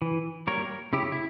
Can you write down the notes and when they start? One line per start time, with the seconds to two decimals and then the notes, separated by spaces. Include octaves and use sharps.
0.02 E3
0.47 G3 A#3 A#4 C#5
0.93 C#3 E4 G4
1.12 E4